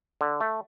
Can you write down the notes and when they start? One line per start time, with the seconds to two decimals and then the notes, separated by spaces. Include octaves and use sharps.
0.21 D3
0.41 A3